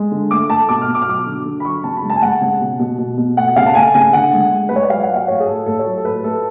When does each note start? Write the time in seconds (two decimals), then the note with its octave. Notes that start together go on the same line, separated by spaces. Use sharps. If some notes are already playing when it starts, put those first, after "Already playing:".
Already playing: G#3
0.12 D3
0.31 A3 D6
0.50 A3 A5
0.69 B2 D6
0.82 F6
0.88 B2
0.95 D6
1.02 F6
1.08 F#3 D6
1.26 D3
1.46 D3
1.60 B5
1.65 F#3 C#6
1.84 C#3 A5
1.97 B5
2.03 G#3
2.10 A5
2.16 G#5
2.22 G#3 F#5
2.41 C#3
2.60 B2
2.79 B2
2.99 B2
3.18 B2
3.37 A3 F#5
3.56 C#3 F5
3.66 A5
3.75 A3 G#5
3.94 C#3 G#5
4.13 D3 F#5
4.33 G#3
4.52 G#3
4.69 G#3 B4
4.76 C#5
4.83 D5
4.90 F#3 F5
5.03 F#5
5.09 F#3
5.16 F5
5.28 A2 C#5
5.40 G#4
5.47 A2 A4
5.66 A2 A4
5.79 C#5
5.86 F#3
5.98 A4
6.05 A2 B4
6.24 A3 A4